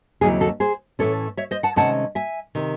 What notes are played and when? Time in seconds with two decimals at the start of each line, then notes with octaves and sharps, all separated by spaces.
0.21 D#2 C#3 F#3 C4 E4 G#4
0.41 F#4 A4
0.60 G#4 C5
0.99 A2 E3 A3 C#4 A4 C#5
1.37 C#5 E5
1.51 C5 D#5
1.63 F#5 A5
1.76 C3 D#3 G#3 C#4 F#5 A5
2.15 E5 G#5
2.55 C3 D#3